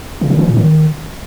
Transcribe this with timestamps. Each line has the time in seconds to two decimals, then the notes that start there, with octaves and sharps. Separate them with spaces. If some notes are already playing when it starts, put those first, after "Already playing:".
0.21 C#3
0.30 D#3
0.39 E3
0.48 A2
0.57 D#3